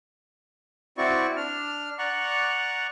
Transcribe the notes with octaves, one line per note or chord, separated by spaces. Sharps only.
C4 E4 F#4 D5 C#6
D4 F6
D5 F#5 A#5 C#6 F#6